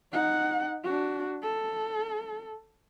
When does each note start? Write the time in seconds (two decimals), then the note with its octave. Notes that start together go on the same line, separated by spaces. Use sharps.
0.12 D#4 F#5
0.84 D4 F#4
1.43 A4